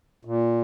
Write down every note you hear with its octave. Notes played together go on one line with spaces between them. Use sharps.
A#2